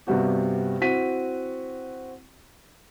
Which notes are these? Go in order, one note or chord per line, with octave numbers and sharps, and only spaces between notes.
G2 C3 G3 B3 F#4 G4
C4 E4 F#4 B6 D#7